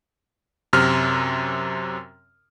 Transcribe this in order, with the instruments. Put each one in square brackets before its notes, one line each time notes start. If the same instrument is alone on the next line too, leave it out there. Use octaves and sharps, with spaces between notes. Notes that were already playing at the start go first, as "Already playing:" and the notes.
[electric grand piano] F#2 C3 F6